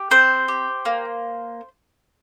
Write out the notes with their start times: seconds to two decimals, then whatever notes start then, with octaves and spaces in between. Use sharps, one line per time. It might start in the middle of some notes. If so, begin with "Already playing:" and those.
Already playing: G4
0.11 C4 C5
0.48 G4
0.85 A#3